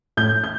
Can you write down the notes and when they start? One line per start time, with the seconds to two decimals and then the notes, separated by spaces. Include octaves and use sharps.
0.17 A2 G6
0.44 G6